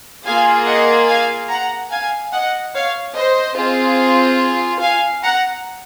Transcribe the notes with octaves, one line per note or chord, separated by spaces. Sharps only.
A#3 F4 G#4 F5 G#5
D#5 F#5
F5 G#5
F#5 A#5
F5 G#5
D#5 F#5
C#5 F5
C5 D#5
C4 F4 G#4
F5 G#5
F#5 A#5